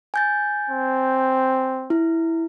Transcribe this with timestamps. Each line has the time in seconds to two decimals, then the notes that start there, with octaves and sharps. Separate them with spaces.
0.14 G#5 G6 A6
0.70 C4
1.90 E4